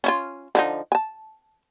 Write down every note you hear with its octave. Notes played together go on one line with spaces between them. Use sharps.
C#4 E4 F4
D3 F3 D#4
G#5 A5